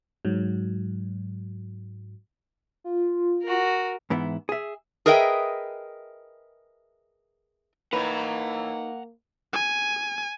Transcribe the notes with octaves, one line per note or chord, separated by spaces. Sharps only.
G#2 F#3
F4
F#4 A#4
G#2 E3 B3 E4
G#4 E5
G#4 A#4 B4 D#5 E5 G5
A2 E3 A#3 D#4 B4 F#5 A#5
G#5